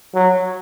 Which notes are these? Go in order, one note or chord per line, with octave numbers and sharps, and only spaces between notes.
F#3